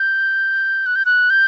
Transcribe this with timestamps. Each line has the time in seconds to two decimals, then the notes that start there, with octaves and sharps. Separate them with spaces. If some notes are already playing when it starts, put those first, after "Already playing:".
Already playing: G6
0.86 F#6
0.95 G6
1.05 F#6
1.30 G6